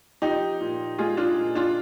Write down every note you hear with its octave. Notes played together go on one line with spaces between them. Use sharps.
F3 D#4 G4
A#2
G#3 F4 G#4
D4 F4
A#2
D4 F4